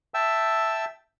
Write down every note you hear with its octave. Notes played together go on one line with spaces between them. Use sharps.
E5 G5 A5 E6